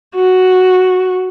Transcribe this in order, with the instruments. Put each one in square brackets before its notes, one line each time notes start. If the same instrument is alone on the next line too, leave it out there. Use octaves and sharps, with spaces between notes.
[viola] F#4